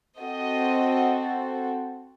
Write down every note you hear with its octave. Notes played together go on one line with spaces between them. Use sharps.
C4 F#4 A4 D#5